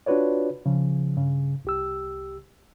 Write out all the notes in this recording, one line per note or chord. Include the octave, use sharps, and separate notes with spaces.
D4 F4 F#4 B4 C#5 D5
C#3 F3
G2 C#3
C2 G4 E6